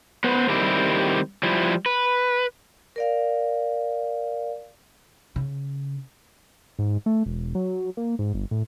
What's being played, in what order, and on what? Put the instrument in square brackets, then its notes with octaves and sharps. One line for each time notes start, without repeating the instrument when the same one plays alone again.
[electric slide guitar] B3 B4 C5
D#3 G3 C4 E4 G4
F3 G3 E4
B4
[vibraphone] A#4 D5 F5
[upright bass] C#3
[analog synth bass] G#2
A3
E1
F#3
A#3
G#2
G1
A2